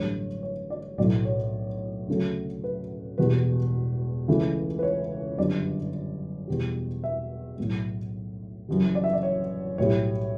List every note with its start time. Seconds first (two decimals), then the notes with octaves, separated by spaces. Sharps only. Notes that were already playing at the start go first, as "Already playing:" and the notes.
Already playing: A1 G2 D3 F#3 A3 C#5
0.43 C#5
0.70 D5
0.98 B1 A2 F#3 A3 D5
1.25 C#5
2.08 D2 C#3 F#3 A3
2.64 B4
3.18 E1 E2 B2 G3 B4
4.28 C#2 C#3 E3 A3
4.79 B4
4.83 C#5
5.38 G1 F#2 D3 G3 D5
6.48 E2 B2 G3
7.04 E5
7.58 B1 A2 F#3
8.69 F#1 F#2 E3 G3
8.95 D5
9.04 E5
9.13 D5
9.23 C#5
9.78 B1 A2 G3 C#5